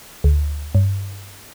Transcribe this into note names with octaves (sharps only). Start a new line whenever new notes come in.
D2
G2